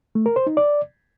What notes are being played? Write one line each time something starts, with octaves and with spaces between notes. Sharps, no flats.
A3
A#4
C5
D#4
D5